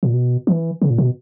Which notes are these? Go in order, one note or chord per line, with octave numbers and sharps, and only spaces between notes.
A#2
B2
E3
C#3
A#2
B2